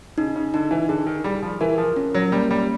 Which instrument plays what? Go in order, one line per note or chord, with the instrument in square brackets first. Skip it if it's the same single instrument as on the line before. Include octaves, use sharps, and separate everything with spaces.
[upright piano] C#3 [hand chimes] D#4
[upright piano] C#3
[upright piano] D3 [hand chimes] D#4
[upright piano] E3
[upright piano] D3 [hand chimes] G#4
[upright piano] D#3
[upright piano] G3 [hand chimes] G#4
[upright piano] F3
[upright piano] E3 [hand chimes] A#4
[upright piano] F3
[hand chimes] C#4
[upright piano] F#3
[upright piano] G3 [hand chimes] A#3
[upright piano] G3